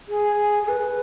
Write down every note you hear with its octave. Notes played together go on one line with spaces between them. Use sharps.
G#4
G#4
B4